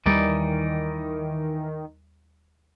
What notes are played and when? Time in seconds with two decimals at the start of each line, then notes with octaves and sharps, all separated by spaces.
0.06 D#2 D#3 E3 G3 D#4 D5